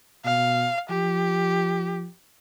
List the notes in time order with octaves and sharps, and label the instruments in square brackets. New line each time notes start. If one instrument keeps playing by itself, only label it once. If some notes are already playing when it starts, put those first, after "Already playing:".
[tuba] B2 [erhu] F5
[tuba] F3 [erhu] G4